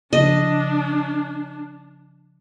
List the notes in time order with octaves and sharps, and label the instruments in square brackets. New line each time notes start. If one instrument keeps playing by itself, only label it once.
[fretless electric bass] C#3 F3 [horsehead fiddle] D4 [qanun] D#5